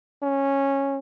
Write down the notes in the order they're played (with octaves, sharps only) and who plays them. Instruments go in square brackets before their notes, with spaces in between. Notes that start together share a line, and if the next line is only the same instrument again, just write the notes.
[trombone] C#4